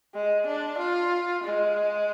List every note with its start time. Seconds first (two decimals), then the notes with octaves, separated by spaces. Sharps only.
0.14 G#3
0.46 D4
0.78 F4
1.44 G#3